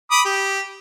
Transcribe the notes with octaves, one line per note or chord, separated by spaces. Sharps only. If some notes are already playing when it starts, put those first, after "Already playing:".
B5 D6 D#6
G4